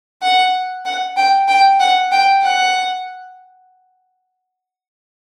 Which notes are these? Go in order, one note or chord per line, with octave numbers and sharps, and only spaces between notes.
F#5
F#5
G5
G5
F#5
G5
F#5